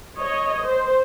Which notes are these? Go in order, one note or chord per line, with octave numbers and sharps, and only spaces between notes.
C#5 D#5
C5